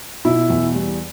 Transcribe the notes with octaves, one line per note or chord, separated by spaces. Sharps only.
B2 E4
E2
G3